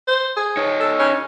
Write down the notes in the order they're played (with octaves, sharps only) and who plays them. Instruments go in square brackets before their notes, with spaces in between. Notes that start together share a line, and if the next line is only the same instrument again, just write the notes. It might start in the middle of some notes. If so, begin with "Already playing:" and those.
[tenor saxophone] C5
G#4
[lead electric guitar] D#4 C#5
[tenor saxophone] A4
C#4